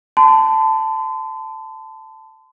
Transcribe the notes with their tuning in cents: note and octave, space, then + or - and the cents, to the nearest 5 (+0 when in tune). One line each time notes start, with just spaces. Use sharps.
A5 +0 C6 -45